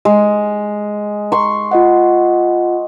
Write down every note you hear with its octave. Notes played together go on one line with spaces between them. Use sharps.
G#3
C6 C#6
F4 D#5 F#5